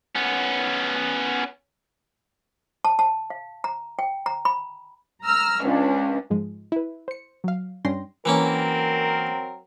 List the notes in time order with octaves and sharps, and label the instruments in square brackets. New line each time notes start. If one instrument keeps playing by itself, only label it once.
[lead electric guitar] B3 C#4
[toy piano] A5
A5
F5
A#5
G5
A#5
B5
[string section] A#5 E6 F6
C#2 C#4 D4
[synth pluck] G#2 F3 G#3
E4 B4
C5 C#7
F#3 F5
G2 C#4 D4 G5 C6 A#6
[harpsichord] E3 A#3 C#4 [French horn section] F#3 C4 A#4